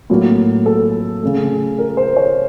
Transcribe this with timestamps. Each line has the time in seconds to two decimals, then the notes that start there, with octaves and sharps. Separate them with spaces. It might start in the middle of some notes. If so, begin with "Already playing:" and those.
0.10 A2 F#3 A#3
0.66 A4
1.23 C#3 A3
1.78 A#4
1.97 C5
2.16 C#5